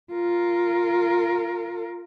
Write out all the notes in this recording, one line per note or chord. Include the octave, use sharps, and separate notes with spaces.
F4 A#4